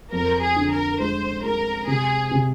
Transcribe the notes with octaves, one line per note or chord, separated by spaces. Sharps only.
F2 A#4
G#4
D3
A#4
G#3 C5
G#3 A#4
C3 G#4
C3